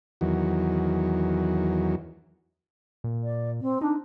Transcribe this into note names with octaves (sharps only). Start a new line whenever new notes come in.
E2 D#3 F#3
A#2
D5
C4
D4 D#4